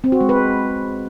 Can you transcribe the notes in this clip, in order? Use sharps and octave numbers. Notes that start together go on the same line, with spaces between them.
C4
F#4
G#3
B4